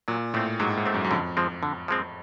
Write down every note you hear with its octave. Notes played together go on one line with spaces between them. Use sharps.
A#2 F#3
A2 A3 C4
G#2 F#3
G#2
A3 C4
F#2
F#2
F2 D3
F3 G#3 C4
D3
F3 G#3 C4